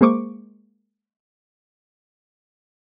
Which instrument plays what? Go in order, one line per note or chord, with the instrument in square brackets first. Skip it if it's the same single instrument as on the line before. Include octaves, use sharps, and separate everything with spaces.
[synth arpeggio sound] G#3 A#3 C5 C#6 D6